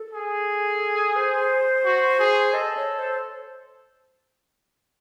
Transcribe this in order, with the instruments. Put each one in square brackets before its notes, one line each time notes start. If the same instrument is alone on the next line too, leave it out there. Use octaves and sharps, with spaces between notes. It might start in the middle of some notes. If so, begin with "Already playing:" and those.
Already playing: [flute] A4
[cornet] G#4
[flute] C5
[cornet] F#4
G#4
[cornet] A4 [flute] D#5
[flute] C#5
C5